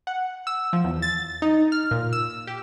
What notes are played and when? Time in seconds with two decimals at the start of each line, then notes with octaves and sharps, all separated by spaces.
0.07 F#5
0.47 E6
0.73 F3
0.84 E2
1.02 A6
1.42 D#4
1.72 F6
1.91 A#2
2.13 E6
2.47 G4